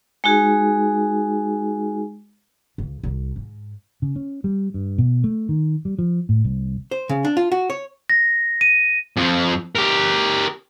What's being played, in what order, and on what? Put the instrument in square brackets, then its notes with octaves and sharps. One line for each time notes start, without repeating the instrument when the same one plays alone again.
[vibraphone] G#3 D#4 F#4 G#4
[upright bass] C#2
C2
G#2
[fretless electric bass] C#3
C#4
G3
G2
B2
A3
D#3
G3
F3
A2
C2
[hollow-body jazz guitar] C5
C#3
D4
F4
F#4
C#5
[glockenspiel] A#6
D#7
[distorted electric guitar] F2 F3
G4 A#4